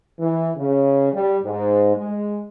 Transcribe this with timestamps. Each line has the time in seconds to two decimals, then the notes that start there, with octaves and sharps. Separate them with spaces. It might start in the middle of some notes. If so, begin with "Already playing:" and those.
0.20 E3
0.57 C#3
1.13 G3
1.44 G#2
1.96 G#3